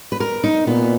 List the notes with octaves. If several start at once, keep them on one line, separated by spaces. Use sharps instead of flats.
B4
A#4
D#4
A#2 B3